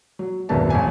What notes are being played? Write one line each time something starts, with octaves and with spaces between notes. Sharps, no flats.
F#3
D#1 G#1 F#2 B3 A5
A1 F2 G#5